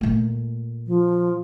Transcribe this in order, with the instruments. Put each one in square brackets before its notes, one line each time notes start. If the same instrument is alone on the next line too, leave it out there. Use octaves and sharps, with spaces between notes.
[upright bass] A#2 A3
[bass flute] F3